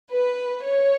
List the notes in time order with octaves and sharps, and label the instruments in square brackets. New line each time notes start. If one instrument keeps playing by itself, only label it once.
[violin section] B4
C#5